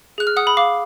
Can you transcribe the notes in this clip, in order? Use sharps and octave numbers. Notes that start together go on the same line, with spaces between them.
G#4 F#6
F6
F#5 D#6
B5
F5 D6